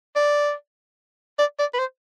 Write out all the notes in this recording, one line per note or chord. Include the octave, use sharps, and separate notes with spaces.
D5
D5
D5
B4
C5